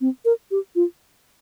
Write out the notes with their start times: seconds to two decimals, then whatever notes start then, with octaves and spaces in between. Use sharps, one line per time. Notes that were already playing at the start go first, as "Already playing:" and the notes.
0.01 C4
0.25 A#4
0.51 G4
0.75 F4